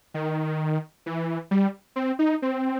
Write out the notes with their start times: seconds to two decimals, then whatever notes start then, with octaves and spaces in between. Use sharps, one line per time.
0.14 D#3
1.06 E3
1.51 G3
1.96 C4
2.19 D#4
2.42 C4